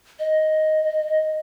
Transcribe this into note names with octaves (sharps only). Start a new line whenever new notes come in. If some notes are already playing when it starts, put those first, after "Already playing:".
D#5